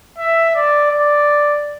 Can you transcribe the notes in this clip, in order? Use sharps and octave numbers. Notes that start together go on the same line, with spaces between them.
E5
D5
D5